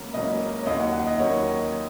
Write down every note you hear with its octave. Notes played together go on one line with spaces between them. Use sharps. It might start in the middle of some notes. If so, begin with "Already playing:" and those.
Already playing: C#2 C#3 F#3 A#3 C#4
C#2 C#3 F#3 A#3 C#4 D#5
C#5
D#2 D#3 F#3 D#5
F#5
F#5
D#5
D#2 D#3 F#3 C#5